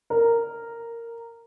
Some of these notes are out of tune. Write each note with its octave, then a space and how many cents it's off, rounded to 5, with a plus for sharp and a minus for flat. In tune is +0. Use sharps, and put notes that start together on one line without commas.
A#4 -10